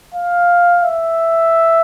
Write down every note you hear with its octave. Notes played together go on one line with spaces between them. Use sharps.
F5
E5